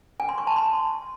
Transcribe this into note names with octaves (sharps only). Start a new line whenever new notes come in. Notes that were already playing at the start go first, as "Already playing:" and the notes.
G#5
C6
C#6
A5
C6